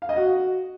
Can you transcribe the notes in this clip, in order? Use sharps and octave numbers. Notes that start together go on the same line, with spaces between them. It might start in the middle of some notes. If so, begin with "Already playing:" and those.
F5
D#5
F#4